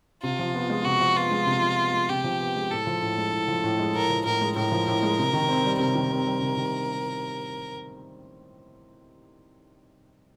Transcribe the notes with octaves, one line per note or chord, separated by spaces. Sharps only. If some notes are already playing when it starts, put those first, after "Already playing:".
C3 F4
F3
B3
G#3
C3 F#4
F3
B3 F4
G#3
C3
F3
B3
G#3
C3 G4
F3
B3
G#3
A2 A4
F3
A2
G#3
A2
F3
A2
G#3
A2 A#4
F3
A2 A#4
G#3
A2 A#4
F3
A2
G#3
C3
D#3
C4
G3
C3 A#4
D#3
C4
G3
C3
D#3